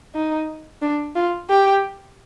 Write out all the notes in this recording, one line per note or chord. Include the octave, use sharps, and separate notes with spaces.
D#4
D4
F4
G4